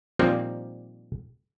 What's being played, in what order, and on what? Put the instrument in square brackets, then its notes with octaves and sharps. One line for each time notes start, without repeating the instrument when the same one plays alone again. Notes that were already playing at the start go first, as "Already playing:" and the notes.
[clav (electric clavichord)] A#2 D#3 F3 G3 A#3 C4